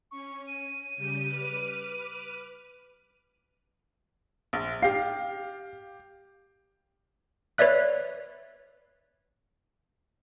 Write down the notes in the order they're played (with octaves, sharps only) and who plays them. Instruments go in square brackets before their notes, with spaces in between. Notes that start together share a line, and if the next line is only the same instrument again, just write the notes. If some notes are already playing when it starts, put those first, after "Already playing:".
[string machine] C#4 [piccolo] C#6
[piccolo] D#7
[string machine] C#3 G3 G4
B4 D6 F6
[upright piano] A#1
[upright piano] G4 C7 [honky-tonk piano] F5
[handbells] B4 C#5 D5 E5 F#6